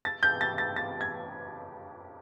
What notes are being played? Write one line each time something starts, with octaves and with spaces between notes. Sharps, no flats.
A6
G6
A6
A6
A6
G#6